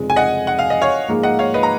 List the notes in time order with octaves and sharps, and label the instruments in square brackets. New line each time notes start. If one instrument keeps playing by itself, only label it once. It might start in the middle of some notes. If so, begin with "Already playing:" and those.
Already playing: [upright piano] F1 F2 C#3 G#3
[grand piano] G#5
D#5 F#5
F#5
F5
D#5
C#5 F5
[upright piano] G#2 F3 A#3 F4 G#4
[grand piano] D#5 F#5
C#5 F5
B4 D#5
A#5